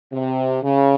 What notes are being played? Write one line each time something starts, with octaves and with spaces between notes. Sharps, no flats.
C3
C#3